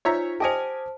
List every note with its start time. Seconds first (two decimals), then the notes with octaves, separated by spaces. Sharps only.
0.05 D#4 F4 C5 C#5 E5 A#5
0.40 G4 C5 D#5 G#5 A5